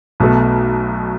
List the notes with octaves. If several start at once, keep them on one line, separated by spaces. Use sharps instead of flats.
B1 B2 A3